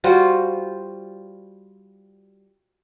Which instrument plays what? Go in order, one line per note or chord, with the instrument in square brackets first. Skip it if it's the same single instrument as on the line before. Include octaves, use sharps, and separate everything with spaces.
[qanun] G3 F4 F#4 C5